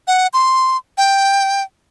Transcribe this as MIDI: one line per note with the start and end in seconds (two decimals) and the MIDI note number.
0.07 0.27 78
0.33 0.77 84
0.98 1.63 79